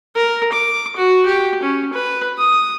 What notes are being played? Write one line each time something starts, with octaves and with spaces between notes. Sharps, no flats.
A#4
D6
F#4
G4
C#4
B4
D#6